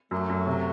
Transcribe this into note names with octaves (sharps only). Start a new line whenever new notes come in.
F#2 F#3 A3
F#2
C3